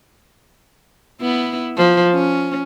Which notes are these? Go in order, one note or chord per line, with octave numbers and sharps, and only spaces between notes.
B3 E4
F3
C#4